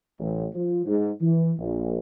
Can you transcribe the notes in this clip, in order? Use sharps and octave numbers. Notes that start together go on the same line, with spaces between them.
A1
F3
G#2
E3
A#1